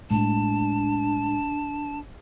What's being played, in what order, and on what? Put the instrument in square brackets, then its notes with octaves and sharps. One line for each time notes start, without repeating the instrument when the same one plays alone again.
[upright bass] A2 G#3 [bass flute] D4 [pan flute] A5